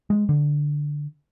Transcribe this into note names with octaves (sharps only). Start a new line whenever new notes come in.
G#3
D3